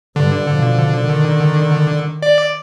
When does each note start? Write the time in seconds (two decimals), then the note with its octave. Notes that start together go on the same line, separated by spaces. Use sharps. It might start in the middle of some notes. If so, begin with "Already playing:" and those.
0.16 G2 D3
0.50 B2 F3
1.00 D#3
2.22 D5